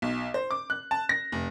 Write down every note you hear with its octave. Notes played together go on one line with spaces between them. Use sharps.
B1
C5
D6
F#6
A5
A#6
F1